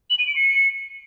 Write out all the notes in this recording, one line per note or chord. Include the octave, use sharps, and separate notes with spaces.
F#7
D#7
D7
C#7